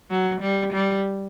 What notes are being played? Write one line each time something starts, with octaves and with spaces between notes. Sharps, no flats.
F#3
G3
G3